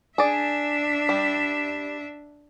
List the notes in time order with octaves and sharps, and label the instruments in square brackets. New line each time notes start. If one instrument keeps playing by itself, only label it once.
[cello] D4 E5 [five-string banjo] G#4 D5
[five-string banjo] G3